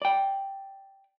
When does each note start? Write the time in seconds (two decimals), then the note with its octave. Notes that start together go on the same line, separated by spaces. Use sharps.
0.02 D5 G5